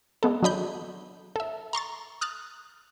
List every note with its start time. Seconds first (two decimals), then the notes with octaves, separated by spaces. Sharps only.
0.23 G#3 B3 A4
0.42 F#3 D4 D#5 B5 G6
1.36 A4 E5
1.73 A#5 C6 C#6 A6
2.21 D#6 F6 F#6 A6